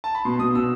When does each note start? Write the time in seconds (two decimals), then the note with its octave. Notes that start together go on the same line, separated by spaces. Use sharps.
0.04 A5
0.15 B5
0.25 B2 C6
0.40 B2 D#6
0.55 B2 E6